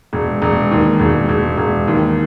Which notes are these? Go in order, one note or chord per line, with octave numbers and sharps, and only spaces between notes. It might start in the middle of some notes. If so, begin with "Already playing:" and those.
E1
E1
D#2
E1
E1
E1
D#2